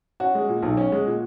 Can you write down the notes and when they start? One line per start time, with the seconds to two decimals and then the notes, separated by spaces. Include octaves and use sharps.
0.20 C#4 F#4
0.35 G#3
0.49 A#2
0.63 B1
0.77 C#4
0.92 G#3
1.06 A#2